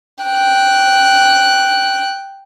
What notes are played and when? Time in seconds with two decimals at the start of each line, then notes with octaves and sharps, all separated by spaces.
0.24 G5 F#6